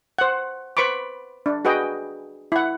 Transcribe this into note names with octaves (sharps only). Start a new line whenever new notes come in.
C5 F#5
B4 C5 B5 C#6 D6
D4
F#4 G#4 B4 D#5 G5
E4 F#5